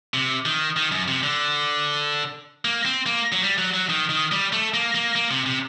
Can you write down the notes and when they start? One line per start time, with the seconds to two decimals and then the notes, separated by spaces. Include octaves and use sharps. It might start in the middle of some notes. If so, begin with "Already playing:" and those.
0.14 C3
0.46 D#3
0.76 D#3
0.91 F#2
1.08 C3
1.23 D3
2.65 A#3
2.85 C4
3.06 A#3
3.32 F#3
3.42 G3
3.58 F#3
3.74 F#3
3.89 D#3
4.10 D#3
4.32 G3
4.52 A3
4.74 A#3
4.95 A#3
5.15 A#3
5.31 C3
5.46 C3